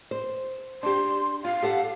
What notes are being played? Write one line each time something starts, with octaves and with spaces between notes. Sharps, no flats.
C5
D4 G4 C6
F4 F5
G4 A4 F#5